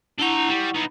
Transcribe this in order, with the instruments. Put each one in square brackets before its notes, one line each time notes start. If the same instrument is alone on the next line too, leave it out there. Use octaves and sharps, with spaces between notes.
[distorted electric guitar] D4 A#5 [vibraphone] E4 F#5 C#6
[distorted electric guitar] G3
B3 D#4